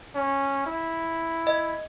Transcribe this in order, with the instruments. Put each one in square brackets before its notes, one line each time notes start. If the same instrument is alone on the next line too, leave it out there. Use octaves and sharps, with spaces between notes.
[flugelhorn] C#4
E4
[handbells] D#5